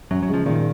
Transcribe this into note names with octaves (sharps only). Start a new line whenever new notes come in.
F#2 F#3
F#3
C#3 F3 G#3
A#2 D#3